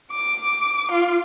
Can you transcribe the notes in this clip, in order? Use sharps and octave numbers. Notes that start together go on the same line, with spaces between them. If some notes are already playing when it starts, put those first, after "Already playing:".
D6
F4